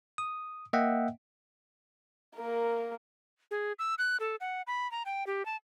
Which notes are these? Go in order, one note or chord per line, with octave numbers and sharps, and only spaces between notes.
D#6
A#3 D#5 E5 F#5 G5
A#3 A#4
G#4
E6
F#6
A4
F#5
B5
A#5
G5
G4
A5